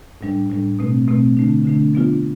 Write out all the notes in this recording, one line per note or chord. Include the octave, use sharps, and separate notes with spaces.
A2 G3 D4
A2 G3 D4
B2 A3 C4
B2 A3 C4
D3 A3 D4
D3 A3 D4
F3 B3 D4 F4